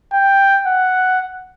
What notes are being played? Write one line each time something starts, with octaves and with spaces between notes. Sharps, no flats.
G5
F#5